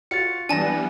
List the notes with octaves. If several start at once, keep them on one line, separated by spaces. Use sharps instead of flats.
F4 F#4 F5 A6 C#7
E3 G3 B3 D4 D5 G#5 A5 A#6